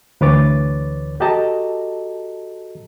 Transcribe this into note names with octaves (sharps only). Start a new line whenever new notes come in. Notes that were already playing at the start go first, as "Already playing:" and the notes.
D2 E3 B4 C#5 D6 A6
F#4 G4 A4 D#5 A5 A#5